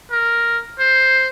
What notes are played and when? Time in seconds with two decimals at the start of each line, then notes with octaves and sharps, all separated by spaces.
0.11 A#4
0.79 C5